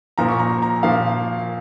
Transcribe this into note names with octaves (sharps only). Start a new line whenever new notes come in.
A#2 F3 A#3 A#5
C#6
A#5
A#5
A#2 F3 A#3 F5